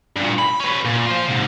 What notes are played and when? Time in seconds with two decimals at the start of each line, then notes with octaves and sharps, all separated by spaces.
0.16 G2 A#2
0.38 B5
0.60 C#4 B4
0.85 A#2
1.06 F4 C5
1.28 G#2 C3